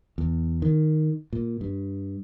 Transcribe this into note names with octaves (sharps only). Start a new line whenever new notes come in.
E2
D#3
A#2
G2